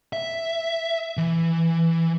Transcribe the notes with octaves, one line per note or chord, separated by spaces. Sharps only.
E5
E3